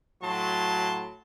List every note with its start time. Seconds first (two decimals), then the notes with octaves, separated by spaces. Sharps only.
0.22 A2 F#3 A5 C6